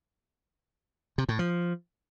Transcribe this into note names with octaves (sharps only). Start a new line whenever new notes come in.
C3
A2
F3